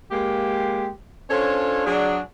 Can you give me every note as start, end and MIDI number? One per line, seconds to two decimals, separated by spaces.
0.11 0.88 56
0.11 0.88 58
0.11 0.88 67
1.30 1.83 61
1.30 1.83 62
1.30 1.83 65
1.30 1.83 69
1.30 1.83 72
1.30 1.83 73
1.86 2.18 54
1.86 2.18 62
1.86 2.18 68